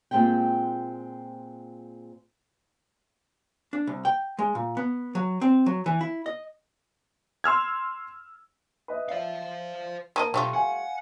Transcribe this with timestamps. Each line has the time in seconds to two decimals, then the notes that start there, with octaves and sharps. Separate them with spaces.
0.11 A#2 G#3 C4 G4 G5
3.73 D4
3.87 C2
4.05 G5
4.39 G#3
4.55 A#2
4.77 B3
5.15 F#3
5.41 C4
5.66 F#3
5.86 E3
6.01 E4
6.26 D#5
7.44 C6 E6 F6 G#6
8.88 B4 D#5 E5
9.09 C5 D5 E5 F5
10.16 A#3 B4 D#5 A5 D#7
10.34 B1 G3 A3 F4
10.54 F5 F#5 G#5